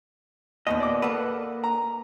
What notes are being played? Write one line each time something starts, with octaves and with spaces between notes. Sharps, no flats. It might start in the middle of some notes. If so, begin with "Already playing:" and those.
D#2 A#2 B3 D#5
D5 D6
A#3 A4 B4 F#5
A#5